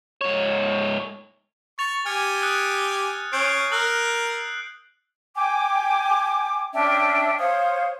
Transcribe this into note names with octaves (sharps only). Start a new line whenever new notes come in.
G#2 C#5
C#6 A6 F7
G4 G#5 F6 G#6 C#7
D#6 F#6 C#7
C#4 G6 C7 D7
A#4 E6 F#6 F#7
G5 G#5 D6
C#4 D4 E5 G5
C5 C#5 F5 D#6